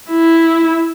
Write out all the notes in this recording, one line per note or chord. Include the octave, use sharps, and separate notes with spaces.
E4